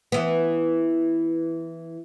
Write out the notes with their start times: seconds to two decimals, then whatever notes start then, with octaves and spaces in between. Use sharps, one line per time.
0.12 E3 B3